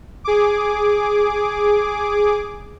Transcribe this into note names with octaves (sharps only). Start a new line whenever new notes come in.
G#4 D6